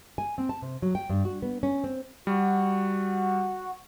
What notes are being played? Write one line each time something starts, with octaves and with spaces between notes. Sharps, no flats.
G#5
C4
A5
C3
F#3
G5
G2
F#4
B3
C#4
C4
G3 F#4